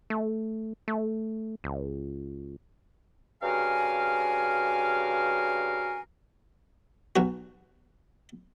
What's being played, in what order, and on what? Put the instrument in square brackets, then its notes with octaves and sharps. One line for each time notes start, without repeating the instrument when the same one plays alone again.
[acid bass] A3
A3
C#2
[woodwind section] G2 C#3 F#4 A#4 F5 G#5
[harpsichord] B1 F#4